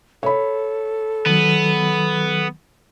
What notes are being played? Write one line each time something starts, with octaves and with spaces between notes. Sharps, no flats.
A4 C#5 B5
D#3 F#3 B3